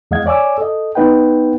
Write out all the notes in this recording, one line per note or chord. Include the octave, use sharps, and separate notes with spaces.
E2 G#3 D#5 F5 F#5 G#6
C#5 D5 G#5 D6 E6
A4 D#5
B3 D#4 B4 F#5 G5